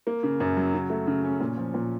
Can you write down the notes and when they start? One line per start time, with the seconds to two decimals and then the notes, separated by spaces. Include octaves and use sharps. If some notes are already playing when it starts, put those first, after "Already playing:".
0.07 A#3
0.23 C#3
0.40 F#2
0.57 F#3
0.74 C#3
0.90 A3
1.07 C#3
1.24 C#4
1.41 A#2
1.57 F3
1.74 A#2